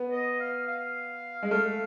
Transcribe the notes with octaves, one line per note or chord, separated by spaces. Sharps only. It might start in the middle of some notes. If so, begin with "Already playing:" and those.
Already playing: B3
D#5
F5
F5
G#3
A3 F5